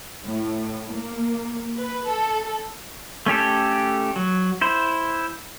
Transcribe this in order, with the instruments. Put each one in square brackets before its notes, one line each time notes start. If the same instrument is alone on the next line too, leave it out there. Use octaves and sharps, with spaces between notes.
[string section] A2
A#3
B4
A4
[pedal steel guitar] A3 C#4 G4 A4
F#3
E4 C5